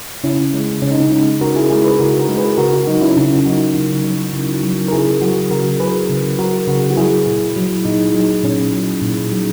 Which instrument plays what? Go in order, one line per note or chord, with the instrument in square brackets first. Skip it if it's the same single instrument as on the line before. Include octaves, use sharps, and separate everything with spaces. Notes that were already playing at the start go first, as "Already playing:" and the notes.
[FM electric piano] C#3 C#4 E4
G#3
C#3 C#4
D#4
C#4
G#3 D#4
C#3 F#4 A#4
E4 G#4
G#3 E4 G#4
G#4 B4
C#3 F#4 A#4
F#4 A#4
G#3
G#4 B4
C#3 F#4 A#4
F#4 A#4
F#3 D#4 F#4
C#4 E4
C#3 C#4 E4
F#3 D#4 F#4
C#3
F#3
C#3
F#3
A#4
C#3 E4 G#4
F#3 F#4 A#4
C#3 F#4 A#4
F#3 G#4 B4
C#3
F#3 F#4 A#4
C#3 F#4 A#4
F#4
F#3 E4 G#4
A#2
F#3
A#2 D#4
F#3 D#4
A#2 C#4
F#3
A#2
F#3